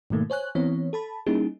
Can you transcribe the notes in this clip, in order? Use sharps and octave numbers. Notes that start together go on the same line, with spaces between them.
G#2 B2 D#3 A3 A#3
C5 C#5 G#5 F#6
E3 B3 C4 C#5
A4 A5 B5
G3 A#3 C#4 D#4 E4 G#4